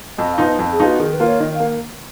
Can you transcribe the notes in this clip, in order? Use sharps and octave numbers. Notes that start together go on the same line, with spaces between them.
F2 D#5
F5
F3 B3 D#4
D#5
F2
G#4
F3 B3 D#4
F#4
D#3 G#4
B4
A#3 F4
C#5
D#3 D#5
F5
A#3